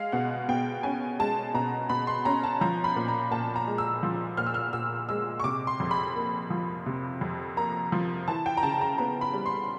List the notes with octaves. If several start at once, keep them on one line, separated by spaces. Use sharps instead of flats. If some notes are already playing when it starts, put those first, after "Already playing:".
Already playing: G#3 F5
B2 F#5
B2 G5
C#4 G#5
G#3 A5
B2 A#5
B2 B5
C6
C#4 A#5
A5
F3 A#5
B5
A#2
A#5
A#2 A5
A#5
G#3
E6
F3
A#2 F6
E6
F6
A#2 E6
G#3 E6
C#6
C3 D6
C6
F2
B5
A#3
F3
C3
F2
A#3 A#5
F3
E3 A5
G5
A#5
C#3 A5
A#5
B3 A#5
B5
G3
C6